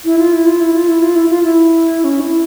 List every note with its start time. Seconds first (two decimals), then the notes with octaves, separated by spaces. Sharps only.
0.05 E4
0.19 F4
0.33 E4
0.46 F4
0.61 E4
0.74 F4
0.88 E4
1.02 F4
1.15 E4
1.29 F4
1.43 E4
2.04 C#4
2.21 E4